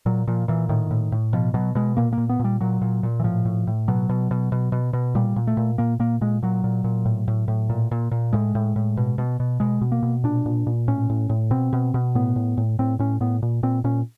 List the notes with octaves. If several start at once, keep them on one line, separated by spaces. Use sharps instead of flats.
A#2 F#3
A#2 F3
A#2 E3
A2 D#3
A2
A2
B2 F3
B2 F#3
B2 G#3
A#2 A#3
A#3
A#2
B3
A#2 G3
A#2 F#3
A#2
A#2
E3
A2 F3
A2
A2
B2 F#3
B2
B2
B2
B2
B2
A#2 G3
A#2
A3
A#2
A#2 A#3
A#2 A#3
A#2 G#3
A#2 F#3
A#2
A#2
A2
A2
A2
A#2
A#2
A#2
A2 G#3
A2
A2
B2
B2
B2
B2 G#3
B2
A#3
B2
A#2 D4
A#2
A#2
A2 C#4
A2
A2
B2 C4
B2
B2
A2 B3
A2
A2
A2 C4
A2 C#4
A2 B3
A#2
A#2 C4
A#2 C#4